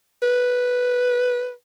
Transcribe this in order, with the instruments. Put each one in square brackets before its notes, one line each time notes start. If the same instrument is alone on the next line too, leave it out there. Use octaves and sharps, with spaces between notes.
[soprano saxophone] B4